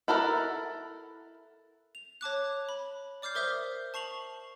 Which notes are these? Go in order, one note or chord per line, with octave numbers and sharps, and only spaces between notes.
E4 A4 A#4 D#5 F#5
F7
C#5 A5 D6 F#6
B5
D5 D6 F6 G6 C7
A#4 C5 E5 D#6 G6
A5 C#6 C7 F7 F#7